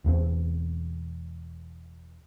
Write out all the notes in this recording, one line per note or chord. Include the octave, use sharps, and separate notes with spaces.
E1 E2 D#3 C4